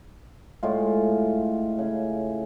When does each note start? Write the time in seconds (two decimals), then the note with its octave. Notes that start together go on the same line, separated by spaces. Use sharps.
0.63 A2 G#3 F4
1.79 C#3